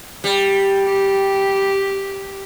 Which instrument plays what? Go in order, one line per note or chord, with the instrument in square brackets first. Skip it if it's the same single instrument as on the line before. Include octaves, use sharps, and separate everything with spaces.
[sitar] G3
[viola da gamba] G4